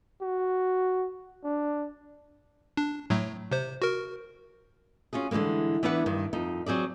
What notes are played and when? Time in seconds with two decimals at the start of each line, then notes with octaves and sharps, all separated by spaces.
0.22 F#4
1.44 D4
2.77 D4
3.10 A2 F#3 A3
3.51 C3 C5
3.82 F#4 A#4
5.13 C#4 F4 F#4 G#4
5.31 D3 E3 G3 G#3 A#3
5.83 E3 B3 D4 E4 B4 F#5
6.06 G2 D#3
6.33 F2 D#4
6.66 F#3 C4 G#4 D5